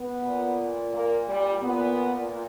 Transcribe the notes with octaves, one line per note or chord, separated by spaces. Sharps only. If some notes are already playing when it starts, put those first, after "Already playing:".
Already playing: B3
A#2
A#3
G3
A#2 B3